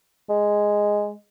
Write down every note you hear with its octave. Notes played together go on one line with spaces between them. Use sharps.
G#3